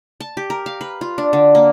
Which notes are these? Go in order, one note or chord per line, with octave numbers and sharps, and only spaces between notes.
A5
G4
A#4
F5
B4
F4
D4
D3
A#3